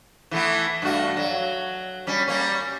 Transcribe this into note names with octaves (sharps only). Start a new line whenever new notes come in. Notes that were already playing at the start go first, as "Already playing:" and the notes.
E3 A3 B3
G2 A3 F#4
F#3
G3 C#4
G3 A#3 C#4